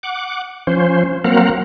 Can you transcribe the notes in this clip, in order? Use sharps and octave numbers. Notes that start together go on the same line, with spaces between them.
F#5 D6
F3 C#4 C5
F#3 A#3 C4 A#4 F5 F#5